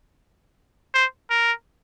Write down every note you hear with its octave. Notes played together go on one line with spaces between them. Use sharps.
C5
A#4